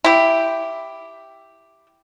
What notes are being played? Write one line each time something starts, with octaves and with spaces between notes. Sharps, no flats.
E4 G4